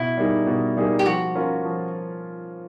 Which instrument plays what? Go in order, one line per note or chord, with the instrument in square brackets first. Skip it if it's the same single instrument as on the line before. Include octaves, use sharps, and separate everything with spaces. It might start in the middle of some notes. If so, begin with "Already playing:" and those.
Already playing: [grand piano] B2 [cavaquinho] E4
[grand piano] G3 A#3 D#4 G#4
B2
G3 A#3 D#4 G#4
[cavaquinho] G4
[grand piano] F3 [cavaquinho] F#4
[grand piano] A#3 C#4 F4 A#4
F3